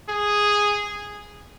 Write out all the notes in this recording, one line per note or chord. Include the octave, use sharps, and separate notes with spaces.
G#4